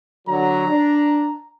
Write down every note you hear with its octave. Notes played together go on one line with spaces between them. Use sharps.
D3 F#3 A#5
D4